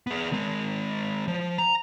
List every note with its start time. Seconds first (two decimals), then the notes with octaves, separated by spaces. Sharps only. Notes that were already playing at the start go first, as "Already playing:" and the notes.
0.07 B3 G#4
0.32 D#3 G#3
1.28 F3
1.58 A#5